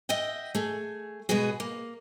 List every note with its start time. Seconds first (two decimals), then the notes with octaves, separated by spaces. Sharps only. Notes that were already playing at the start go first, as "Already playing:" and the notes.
0.09 D#5 E5 F#5 G5
0.55 A3 G#4
1.29 B2 G#3 B3 F#4 G#4
1.60 A#3